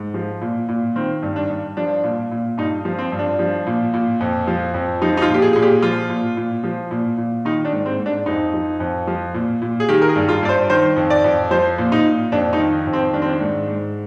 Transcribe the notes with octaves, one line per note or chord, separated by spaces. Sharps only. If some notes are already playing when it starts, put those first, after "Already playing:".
Already playing: G#2
F3
A#2
A#2
D#3 C4
G2
D4
G2
F3 D4
A#2
A#2
G2 D#4
F3
C4
G2
D4
F3
A#2
A#2
F2
F3
F2
F3 D#4
D#4
F4
A#2
G4
G#4
A#2 G#4
G4
F3 F4
A#2
A#2
F3
A#2
A#2
D#3 D#4
D4
G#2
C4
G#2
D4
F2 D#4
F3
F2
F3
A#2
A#2
G#4
D#3 G4
A#4
G#4
G2
F4
G2 D5
C5
D#3 C5
F2
D5
F2
F3 C5
A#2
D#4
A#2
F2 D4
D#4
D#3
F2
C4
D#3 D4
C4
D4
G#2
G#2